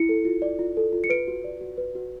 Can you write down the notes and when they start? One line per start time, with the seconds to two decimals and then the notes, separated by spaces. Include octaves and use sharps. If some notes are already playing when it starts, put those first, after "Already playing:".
Already playing: E4 C#7
0.09 A4
0.25 F4
0.42 D5
0.59 F4
0.77 A4
0.93 F4
1.04 C#7
1.10 B4 D7
1.28 F#4
1.44 D5
1.61 F#4
1.78 B4
1.95 F#4